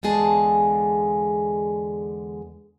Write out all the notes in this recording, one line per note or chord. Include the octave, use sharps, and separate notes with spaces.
E2 D3 G#3 G#4 A5